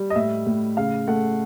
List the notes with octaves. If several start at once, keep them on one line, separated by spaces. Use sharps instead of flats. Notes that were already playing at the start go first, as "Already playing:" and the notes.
Already playing: G3
D#5
A2 E5
A2
C#3 F5
A3 F#5